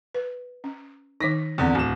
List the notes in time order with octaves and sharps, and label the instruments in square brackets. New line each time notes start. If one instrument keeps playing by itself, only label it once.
[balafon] B4
C#4
[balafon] D#3 D#4 [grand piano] A#6 B6
[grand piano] E2 D3 [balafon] C4
[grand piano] D1 E7